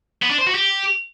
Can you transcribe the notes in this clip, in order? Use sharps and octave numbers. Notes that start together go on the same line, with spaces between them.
B3
D4
C5
F#4
G4